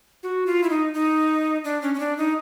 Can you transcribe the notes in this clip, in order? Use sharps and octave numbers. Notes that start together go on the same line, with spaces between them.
F#4
F4
E4
D#4
D#4
D4
C#4
C#4
D4
D#4